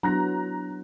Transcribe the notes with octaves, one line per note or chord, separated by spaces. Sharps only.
F#3 B3 D4 E4 A#5 F#6 A#6